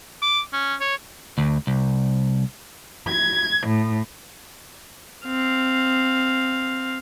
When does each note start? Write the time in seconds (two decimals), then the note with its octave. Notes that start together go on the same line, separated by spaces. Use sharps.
0.22 D6
0.53 C#4
0.81 C#5
1.38 D2
1.67 C2
3.08 G#6
3.67 A2
5.26 C4 F5